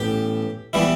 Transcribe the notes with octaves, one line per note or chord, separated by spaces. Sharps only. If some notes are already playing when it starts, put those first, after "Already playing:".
Already playing: A1 A2 B3 G4
E3 G3 B3 E4